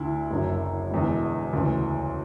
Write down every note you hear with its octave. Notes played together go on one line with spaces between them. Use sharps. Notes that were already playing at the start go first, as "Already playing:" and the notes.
Already playing: D2 D3 E4
F#1 F#2 D3
E1 E2 D3
D2 C#3 E3